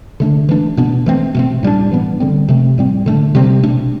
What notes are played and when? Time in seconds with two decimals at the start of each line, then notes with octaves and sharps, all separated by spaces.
0.20 D3 A3 D4
0.49 E3 A3 D4
0.77 B2 B3 D4
1.06 E3 A3 C4
1.35 B2 A3 C4
1.63 A2 G3 B3 D4
1.91 E3 G3 B3 D4
2.20 D3 G3 C4
2.48 C3 F3 A3 C4
2.78 A2 G3 C4
3.06 D3 A3 D4
3.35 C3 G3 C4
3.63 B2 A3 D4